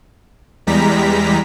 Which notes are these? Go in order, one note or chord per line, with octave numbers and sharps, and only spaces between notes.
E2 G3 G#3 A#5 B6